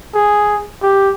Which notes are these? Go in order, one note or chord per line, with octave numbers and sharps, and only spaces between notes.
G#4
G4